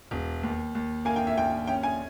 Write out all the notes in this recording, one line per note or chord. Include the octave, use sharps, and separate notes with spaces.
E1
D#2
D#2
A#3 G#5
G5
E5
D#2 G5
C#4 G5
G#5